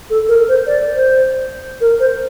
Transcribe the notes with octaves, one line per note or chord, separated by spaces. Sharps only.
A4
A#4
C5
D5
C5
A#4
C5